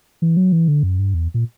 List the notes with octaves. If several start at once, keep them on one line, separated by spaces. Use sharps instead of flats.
E3
F#3
E3
D3
F#2
G2
E2
A#2